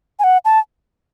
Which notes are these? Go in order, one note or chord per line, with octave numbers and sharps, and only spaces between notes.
G#5
F#5
A5